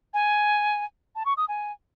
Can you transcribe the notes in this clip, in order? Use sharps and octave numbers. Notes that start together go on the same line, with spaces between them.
G#5
A5
C#6
D#6
G#5